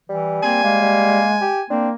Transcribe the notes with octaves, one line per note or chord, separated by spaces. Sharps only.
E3 G3
A#3 C4 G#5
G#3 A#3
G3
G4
A#3 C4 D4